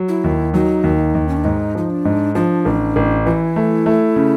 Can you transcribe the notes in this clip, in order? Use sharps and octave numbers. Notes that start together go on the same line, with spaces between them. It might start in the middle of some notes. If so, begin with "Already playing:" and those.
Already playing: F#3
E4
D#2
F#3 D#4
D#2
D#2
C#4
D4
G#2 D#4
F3 D#4
D4
G#2
F3 D4
A1
A1
E3 E4 F4
A3
A3
C#3